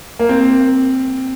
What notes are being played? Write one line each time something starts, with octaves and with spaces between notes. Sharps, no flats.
A#3
C4